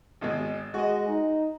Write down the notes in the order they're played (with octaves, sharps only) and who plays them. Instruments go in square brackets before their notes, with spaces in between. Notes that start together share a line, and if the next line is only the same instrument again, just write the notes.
[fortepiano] G#1 B2 G#3
[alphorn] G#3 [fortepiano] F#4 D#5
[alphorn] D#4